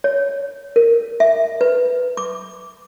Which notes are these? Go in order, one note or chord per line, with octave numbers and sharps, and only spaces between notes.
C#5
A#4
E5
B4
D6